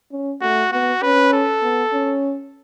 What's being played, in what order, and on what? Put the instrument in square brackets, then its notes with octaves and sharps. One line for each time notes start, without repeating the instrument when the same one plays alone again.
[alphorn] C#4
[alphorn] A3 [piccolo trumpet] F#4
[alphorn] B3 [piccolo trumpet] F#4
[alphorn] C#4 [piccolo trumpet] B4
[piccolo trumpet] A4
[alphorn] B3
C#4